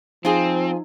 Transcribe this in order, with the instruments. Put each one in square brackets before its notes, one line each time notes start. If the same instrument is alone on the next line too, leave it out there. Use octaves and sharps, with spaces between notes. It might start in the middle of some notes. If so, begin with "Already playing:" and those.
[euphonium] F3 [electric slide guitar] C4 [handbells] D#4 [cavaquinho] F4 G#4